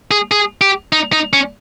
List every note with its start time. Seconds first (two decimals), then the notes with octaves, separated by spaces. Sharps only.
0.11 G#4
0.31 G#4
0.61 G4
0.93 D#4
1.12 D#4
1.33 C#4